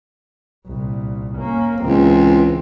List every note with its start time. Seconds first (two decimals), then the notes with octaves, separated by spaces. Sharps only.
0.67 C2 A#2
1.38 A#3 C#4
1.80 C#2 E3 C4